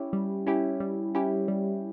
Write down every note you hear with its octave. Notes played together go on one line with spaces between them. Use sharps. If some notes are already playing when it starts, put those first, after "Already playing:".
Already playing: C#4 E4 G4
G3
C#4 E4 G4
G3
C#4 E4 G4
G3